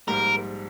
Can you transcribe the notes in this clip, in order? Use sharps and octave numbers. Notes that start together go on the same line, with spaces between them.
A#1 G#2 G3 A#4